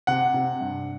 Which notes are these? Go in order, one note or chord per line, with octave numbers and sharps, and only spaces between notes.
C3 F#5
C3
G2